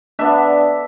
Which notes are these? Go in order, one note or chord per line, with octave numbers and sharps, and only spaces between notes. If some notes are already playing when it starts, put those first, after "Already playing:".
D3 B3 D4 E5